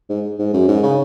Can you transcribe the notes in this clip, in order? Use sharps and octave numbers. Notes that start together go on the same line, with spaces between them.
G#2
G#2
F#2
G#2
C#3